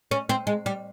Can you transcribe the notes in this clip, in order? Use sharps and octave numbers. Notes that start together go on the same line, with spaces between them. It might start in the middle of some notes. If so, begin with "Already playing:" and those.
C#4
C4
G#3
G3